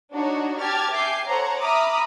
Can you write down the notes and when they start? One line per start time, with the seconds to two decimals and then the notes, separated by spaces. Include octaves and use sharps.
0.12 D4 D#4 F#4 C#5
0.60 G4 A5 F6 G#6 A6
0.94 E5 G5 G#5 D6 G6 C7
1.27 A4 C5 C#5 F#5 A#5
1.62 E5 A#5 B5 D6 D#6 F6